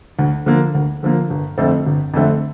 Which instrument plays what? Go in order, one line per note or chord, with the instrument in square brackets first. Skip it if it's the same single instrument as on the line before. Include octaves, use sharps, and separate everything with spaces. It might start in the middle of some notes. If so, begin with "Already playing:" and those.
[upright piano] D2
D3 F3 A#3
D2
D3 F3 A#3
G1
F2 D3 A3 C4
G1
F2 D3 A3 C4